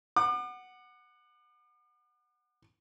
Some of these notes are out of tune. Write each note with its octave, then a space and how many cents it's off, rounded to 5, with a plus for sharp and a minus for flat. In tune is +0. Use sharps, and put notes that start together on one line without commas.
F#5 +0 D6 +45